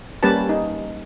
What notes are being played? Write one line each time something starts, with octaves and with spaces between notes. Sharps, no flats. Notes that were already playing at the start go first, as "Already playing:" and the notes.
G3 A#3 C#4 G4 B4 A5
D#4